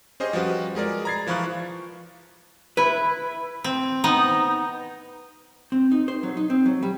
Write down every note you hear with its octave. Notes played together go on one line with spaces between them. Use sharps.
C#4 G4 G#4 C5 D#5
F3 G3 F#4 B4
G#3 G#4 A#4 D5
A#5 B5 G#6 A6 C7
E3 F3 F4 B5 C#6 F#6
E4 B4
C4
B3 D#4
C4
D#4
C5
F#3
D#4
C4
F#3
G3